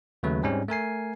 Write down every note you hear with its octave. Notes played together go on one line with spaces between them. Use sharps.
D#2 C#3 F#3 A3 B4
G#2 G3 G#3 C4 C#4
A3 A#4 G#5 C7